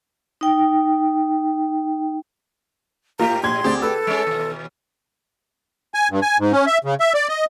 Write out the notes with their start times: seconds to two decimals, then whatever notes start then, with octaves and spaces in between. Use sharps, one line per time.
0.41 D#4 G5
3.19 G#2 A#3 F4 G4 A#5
3.43 A#1 C6 G#6
3.64 D2 C4 G4 G#4 D5
3.82 A4 B4 E6
4.07 G#3 C#4
4.27 D#2 B2
5.94 G#5
6.11 G2
6.22 G#5
6.39 G#2
6.52 C#4
6.67 E5
6.84 C#3
7.00 E5
7.14 D5
7.29 D#5